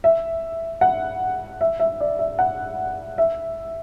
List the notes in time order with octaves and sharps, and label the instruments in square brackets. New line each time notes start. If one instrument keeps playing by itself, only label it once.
[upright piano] E5
F#5
E5
E5
D5
E5
F#5
E5